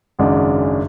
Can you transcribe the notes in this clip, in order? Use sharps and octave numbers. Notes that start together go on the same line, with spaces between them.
G#1 F#2 C#3 G#3 D4